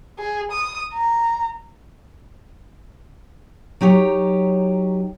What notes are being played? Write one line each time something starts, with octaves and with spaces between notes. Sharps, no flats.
G#4
D#6
A#5
F#3 D#4 G4 C#5